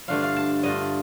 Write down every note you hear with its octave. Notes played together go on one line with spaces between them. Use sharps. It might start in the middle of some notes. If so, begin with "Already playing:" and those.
G2 D3 A3 D4 F4 F5
F5
A5
G2 D3 A3 D4 F4 D#5